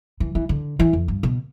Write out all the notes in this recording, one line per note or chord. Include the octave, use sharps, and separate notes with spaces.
E3
E3
D3
E3
F2
G2
B2